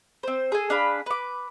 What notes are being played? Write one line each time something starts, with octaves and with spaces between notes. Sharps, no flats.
C4 C5
G#4 A4 G#5
D4 G#4 F5 B5
B4 D6